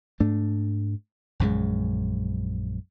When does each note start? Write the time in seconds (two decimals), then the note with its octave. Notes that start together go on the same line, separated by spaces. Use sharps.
0.20 G#2 A3 D4
1.40 A#1 F#2 C#3 G#3